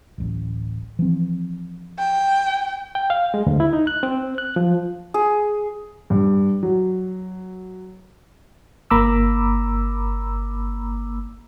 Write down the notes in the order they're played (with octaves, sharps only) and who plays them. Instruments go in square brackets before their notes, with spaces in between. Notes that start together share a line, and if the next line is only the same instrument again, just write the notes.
[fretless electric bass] D1 A1
E3 F3 C4
[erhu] G5
[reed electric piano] G5
F5
G#3
D2
E4
D#4
F#6
C4
F#6
F3
[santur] G#4
[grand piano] G2
F#3
[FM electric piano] G1 A#3 A#5 B5 D6 E6